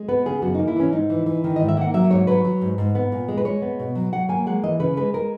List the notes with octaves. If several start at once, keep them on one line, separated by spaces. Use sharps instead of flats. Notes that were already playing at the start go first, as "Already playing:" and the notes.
Already playing: G#3
B3 B4
C#3 G#4
F#2 F#4
A#3 D#4
E4
E3 C#4
G#2 D#4
E3
E3
D#3
G#2 D#5
E5
A#3 F#5
F#3 E5
G#2 C#5
F#3 B4
F#3
G#2
G#2
B3
A#2
G#3
B4
G#3 C#5
B3
B2
F#3
F#3 F#5
A#3 G#5
G#3 F#5
E3 D#5
C#3 B4
G#3 B4
G#3 A#4